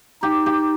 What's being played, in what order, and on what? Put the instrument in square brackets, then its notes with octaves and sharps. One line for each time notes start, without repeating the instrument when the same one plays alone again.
[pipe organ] D#4 [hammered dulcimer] G4
[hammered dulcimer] G4